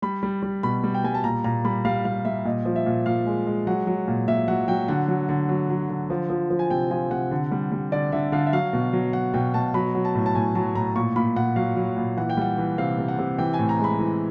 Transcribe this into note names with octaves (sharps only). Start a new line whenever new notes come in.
G3 B5
G3
G3
B2 B5
G3
G5
G3 G#5
A5
A#2 A#5
A#2 A#5
G3 B5
G3 F5
G3 F5
G3 E5
A#2 D#5
F3
E5
A#2
A#2 F5
G#3
G#3
F#3 F#5
F#3
A#2
A#2 E5
F#3 F#5
F#3 G5
D3 F#5
F#3
D3
F#3
F#3
D3
F3
F3
F3
G#5
C3 G5
F3 G#5
C3 F#5
D3
G3
G3
D3 D5
D3 E5
D3 F5
E5
F#3 F5
B2
F#3
F#3 F#5
B2 G5
B2 A5
F#3 B5
F#3
A5
A2
A5
A2 G#5
F#3 A5
A2 A#5
A#2 C#6
A#2 B5
A#2 F#5
F#3 F5
F#3
A#2
E3 F#5
G5
G3 F#5
E3
C3 F5
C3
F#5
C3
E3 G5
G#5
A2
A#5
G#3 B5
E3